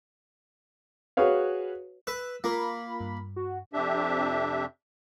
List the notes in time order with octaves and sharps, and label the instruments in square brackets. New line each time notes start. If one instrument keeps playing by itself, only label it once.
[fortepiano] F#4 G#4 B4 C#5 F5
[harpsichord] B4 [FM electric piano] E6
[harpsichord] A#3 [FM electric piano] F4 A#4 [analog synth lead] B5
[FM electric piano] G2
[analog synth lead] F#4
[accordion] F2 C3 D4 G4 E5